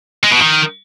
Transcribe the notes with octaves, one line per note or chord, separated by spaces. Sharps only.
G#3
B2
D#3